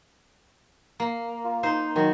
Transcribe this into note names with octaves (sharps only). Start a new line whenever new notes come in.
A#3
F4
D#4 C5
D#3 F#3